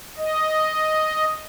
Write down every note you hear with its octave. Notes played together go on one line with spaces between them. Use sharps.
D#5